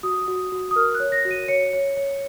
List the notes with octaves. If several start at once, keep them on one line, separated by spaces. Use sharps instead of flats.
F#4 D#6
F#4
F#4
D#6
A#4 F6
F#6
C#5
A#6
F#4
D#7
C#5 C#7
C#5
C#5